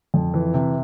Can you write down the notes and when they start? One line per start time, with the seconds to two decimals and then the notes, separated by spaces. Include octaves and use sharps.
0.14 F2
0.34 E3
0.54 C3